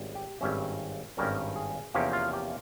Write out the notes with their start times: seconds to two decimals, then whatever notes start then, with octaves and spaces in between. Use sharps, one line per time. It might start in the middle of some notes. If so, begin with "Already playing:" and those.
Already playing: G#1 G3 C#4
0.15 G4
0.41 G#1 G2 G3 C#4 E5
1.17 G#1 G2 G3 C#4 A#4
1.56 G#4
1.94 E2 C3 F3 A#3 C#4 G4
2.13 F4
2.33 G4